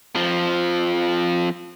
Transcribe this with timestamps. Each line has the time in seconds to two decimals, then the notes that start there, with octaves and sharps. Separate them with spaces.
0.16 F2 F3